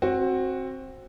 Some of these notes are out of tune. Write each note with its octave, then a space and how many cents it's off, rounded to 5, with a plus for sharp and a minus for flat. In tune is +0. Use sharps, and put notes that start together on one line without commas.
C4 +20 F#4 +0